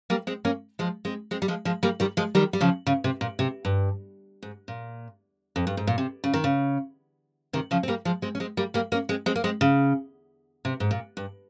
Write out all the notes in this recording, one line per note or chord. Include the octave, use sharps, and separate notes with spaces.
G3 A#3
G#3 C4
A#3 C#4
F3 G#3
G#3 C4
G#3 C4
G3
F3 G#3
F3 G#3
G3 A#3
D#3 G3
F3 G#3
D#3 G3
G3
C#3 F3
C#3
C3
A#2
C3
G2
G#2
A#2
F2
G2
G#2
A#2
C3
C#3
D#3
C#3
C3 D#3
C#3 F3
C4
G3 A#3
F3 G#3
G#3 C4
C#4
G#3 C4
G3 A#3
G3 A#3
A#3 C#4
G#3 C4
G#3 C4
A#3
G#3 C4
C#3
C3
G#2
A#2
G2